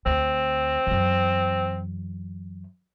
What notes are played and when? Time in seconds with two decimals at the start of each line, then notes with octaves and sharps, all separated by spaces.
0.06 D2 C4
0.86 F#2 E3